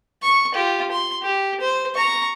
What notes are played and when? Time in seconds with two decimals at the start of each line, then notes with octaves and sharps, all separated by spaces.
0.22 C#6
0.55 F4 G4
0.91 C6
1.22 G4
1.61 C5
1.95 A#5 C#6